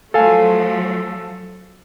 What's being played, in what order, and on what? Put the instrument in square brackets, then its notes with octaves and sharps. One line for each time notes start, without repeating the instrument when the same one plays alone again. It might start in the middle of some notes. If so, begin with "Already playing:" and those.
[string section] F3 F#3 A3 [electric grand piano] A4 F5 G#5